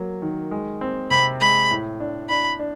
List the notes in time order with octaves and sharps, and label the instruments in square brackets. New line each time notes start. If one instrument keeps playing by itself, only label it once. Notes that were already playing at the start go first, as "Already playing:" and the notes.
Already playing: [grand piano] F#3 A#3
D#3
G#3
C4
[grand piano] C3 [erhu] B5
[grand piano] G#3 [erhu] B5
[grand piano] A2
D4
[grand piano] D4 [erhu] B5
[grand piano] D4